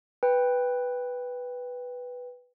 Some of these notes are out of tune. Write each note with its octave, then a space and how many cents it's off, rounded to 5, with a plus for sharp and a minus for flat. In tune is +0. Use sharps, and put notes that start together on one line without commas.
B4 +0 G5 +15